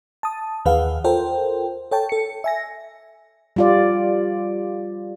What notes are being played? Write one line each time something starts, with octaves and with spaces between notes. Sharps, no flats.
A5 D#6
D#2 E3 G#4 B4 F5 F#5
F4 A4 A#4 C5 G5
A4 C#5 G5 A5
A4 C#7
E5 G#5 A#6
G3 F4 D5